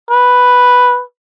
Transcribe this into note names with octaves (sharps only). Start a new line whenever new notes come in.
B4